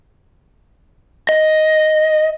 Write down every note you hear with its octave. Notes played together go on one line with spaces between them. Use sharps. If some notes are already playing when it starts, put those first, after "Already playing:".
D#5